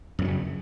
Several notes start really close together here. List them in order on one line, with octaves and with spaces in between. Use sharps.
F#2 E3 F#3 C#3